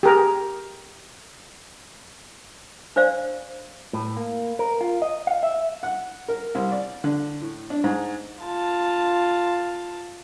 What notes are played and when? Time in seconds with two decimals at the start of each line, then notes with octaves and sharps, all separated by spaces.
0.03 G4 G#4 A#4
2.96 D4 C5 D5 F5
3.93 A2
4.17 A#3
4.59 A#4
4.81 F4
5.02 D#5
5.27 F5
5.43 E5
5.83 F#5
6.28 A#4
6.55 C2
6.72 D5
7.04 D3
7.41 A2
7.70 D4
7.84 G#2
8.44 F4 A5